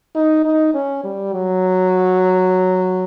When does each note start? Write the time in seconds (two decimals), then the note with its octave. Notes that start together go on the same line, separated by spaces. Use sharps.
0.16 D#4
0.45 D#4
0.74 C#4
1.04 G3
1.33 F#3